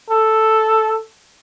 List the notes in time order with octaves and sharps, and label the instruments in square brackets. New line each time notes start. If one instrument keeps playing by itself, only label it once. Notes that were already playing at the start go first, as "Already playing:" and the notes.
[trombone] A4